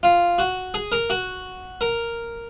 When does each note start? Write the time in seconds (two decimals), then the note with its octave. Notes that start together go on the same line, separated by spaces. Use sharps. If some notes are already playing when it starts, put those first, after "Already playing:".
0.03 F4
0.38 F#4
0.74 G#4
0.92 A#4
1.10 F#4
1.81 A#4